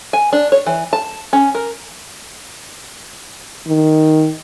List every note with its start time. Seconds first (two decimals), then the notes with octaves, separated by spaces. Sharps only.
0.13 G#5
0.33 D4
0.52 C#5
0.66 E3
0.93 A5
1.33 C#4
1.55 A#4
3.67 D#3